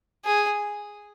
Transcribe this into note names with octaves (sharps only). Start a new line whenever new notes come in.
G#4